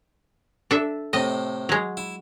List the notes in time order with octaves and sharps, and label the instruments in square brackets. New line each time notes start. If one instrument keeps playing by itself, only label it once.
[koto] D4 A4 E5
[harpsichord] A2 C3 [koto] D#5
[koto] F#3 G#3
[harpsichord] E4